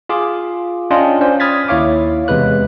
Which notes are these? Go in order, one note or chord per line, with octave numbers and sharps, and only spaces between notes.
F4 G#4 F5 D6
C#4 D4 F4 D#5 G5 C6
C#4 C5 D5
B5 D#6 F6 G#6 A6 B6
D#2 E4 C#5 F5 D6
E2 C3 G#3 B4 F#6